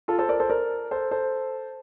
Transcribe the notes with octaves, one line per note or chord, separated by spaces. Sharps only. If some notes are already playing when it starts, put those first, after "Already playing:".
F4 A4
A4 C5
A#4 D5
A4 C5
A#4 D5
A4 C5
A4 C5